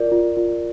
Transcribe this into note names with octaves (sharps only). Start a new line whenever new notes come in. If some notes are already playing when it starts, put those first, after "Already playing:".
Already playing: F4 A#4 D5
F4
F4